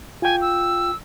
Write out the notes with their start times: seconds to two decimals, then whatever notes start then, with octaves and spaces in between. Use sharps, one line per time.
0.22 F4 G5 G#5
0.41 E6